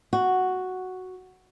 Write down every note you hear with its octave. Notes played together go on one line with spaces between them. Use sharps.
F#4